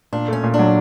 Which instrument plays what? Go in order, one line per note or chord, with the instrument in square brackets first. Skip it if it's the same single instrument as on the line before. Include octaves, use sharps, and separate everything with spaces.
[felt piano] A#2 [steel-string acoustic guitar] D4
[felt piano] A3 [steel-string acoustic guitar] C#4
[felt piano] A#2
[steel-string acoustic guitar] D4
[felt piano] F#3